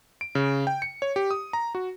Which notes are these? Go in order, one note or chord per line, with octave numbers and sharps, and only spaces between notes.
D7
C#3
G5
C#7
C#5
G4
D#6
A#5
F#4